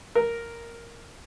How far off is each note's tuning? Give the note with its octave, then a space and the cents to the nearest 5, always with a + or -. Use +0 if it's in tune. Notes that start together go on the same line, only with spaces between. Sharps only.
A#4 +0